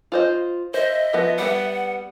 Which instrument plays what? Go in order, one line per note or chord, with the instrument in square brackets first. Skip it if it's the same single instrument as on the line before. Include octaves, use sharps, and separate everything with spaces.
[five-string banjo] F4 C5 D#5
[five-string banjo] C5 [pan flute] D#5 [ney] E5
[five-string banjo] F3 B3
[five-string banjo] G3 B3 [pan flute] F#5